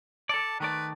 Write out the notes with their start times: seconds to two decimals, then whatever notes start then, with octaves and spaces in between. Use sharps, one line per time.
0.29 A4 D5 A5
0.60 D#3 A3 B4 D5